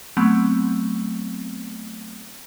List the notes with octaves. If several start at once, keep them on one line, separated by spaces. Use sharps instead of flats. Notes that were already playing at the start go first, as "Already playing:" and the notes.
F#3 A3 B3 C4